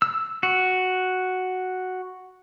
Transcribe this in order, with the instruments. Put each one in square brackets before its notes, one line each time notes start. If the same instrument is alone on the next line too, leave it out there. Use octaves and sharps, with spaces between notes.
[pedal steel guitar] E6
F#4